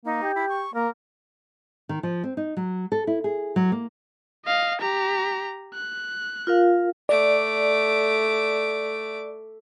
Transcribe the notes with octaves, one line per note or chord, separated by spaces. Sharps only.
A#3 D#4
G4
E4
C#6
A#3 A#4
D#3
F3
C4
D#4
F#3
A4
E4
G#4
F#3
A#3
D#5 F5
G4 A#5
F#6
F4 A#4 F5
A3 D5 D6